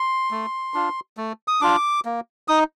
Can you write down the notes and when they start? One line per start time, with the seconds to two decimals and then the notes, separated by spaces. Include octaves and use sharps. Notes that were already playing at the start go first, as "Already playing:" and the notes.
Already playing: C6
0.31 A3
0.74 D4 F4
1.17 A3
1.48 D#6
1.61 D4 F4 D6
2.05 A#3
2.48 D#4 D#6